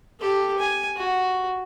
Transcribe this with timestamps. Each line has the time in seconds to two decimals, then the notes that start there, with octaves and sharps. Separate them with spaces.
0.20 G4 A4
0.58 G#5
0.96 F#4